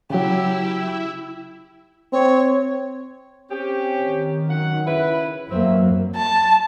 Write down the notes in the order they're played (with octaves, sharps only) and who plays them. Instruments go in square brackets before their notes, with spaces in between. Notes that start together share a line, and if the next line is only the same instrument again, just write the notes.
[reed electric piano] C#3 F#3 [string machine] E4 E5 [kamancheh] G4
[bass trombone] C4 [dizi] C#5
[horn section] C4 C#4 G4
[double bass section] D#3
[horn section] F#2 F#5
C#3 E4 B4
[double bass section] F#2 F#3 A#3 [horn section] C4 E5
[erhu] A5